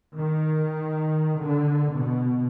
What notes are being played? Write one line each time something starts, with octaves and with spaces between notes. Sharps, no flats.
D#3
D3
B2